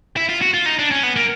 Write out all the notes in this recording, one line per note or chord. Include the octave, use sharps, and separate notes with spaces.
E4
F4
F#4
F4
D#4
D4
C#4
B3
A#3